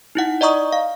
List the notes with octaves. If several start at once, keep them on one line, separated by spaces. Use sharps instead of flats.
D#4 E4 F#5
D5 D#5 A#5 C#6 D#6
F5